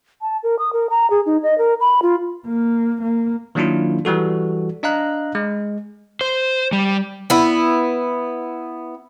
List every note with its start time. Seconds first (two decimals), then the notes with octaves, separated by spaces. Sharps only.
0.22 A5
0.43 A#4
0.59 D#6
0.73 A#4
0.90 A#5
1.10 G#4
1.26 D#4
1.43 D#5
1.58 A#4
1.80 B5
2.02 F4
2.47 A#3
3.02 A#3
3.55 D#3 F#3 A#3 D4 E4 F4
4.05 E3 G3 F#4 A4
4.83 D4 D#5 F5 A#5 F#6
5.35 G#3
6.21 C5
6.73 G3
7.30 B3 E4